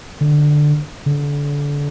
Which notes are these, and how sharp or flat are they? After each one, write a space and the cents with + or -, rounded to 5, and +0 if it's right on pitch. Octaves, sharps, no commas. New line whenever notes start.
D3 +10
D3 -30